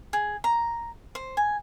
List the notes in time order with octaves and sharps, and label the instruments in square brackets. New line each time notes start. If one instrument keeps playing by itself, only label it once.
[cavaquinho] G#4
A#5
C5
G#5